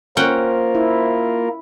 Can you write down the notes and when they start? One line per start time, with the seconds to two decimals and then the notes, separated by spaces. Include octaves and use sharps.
0.17 A#3 C#4 F4 A#4 C5 F#5 G5
0.75 E4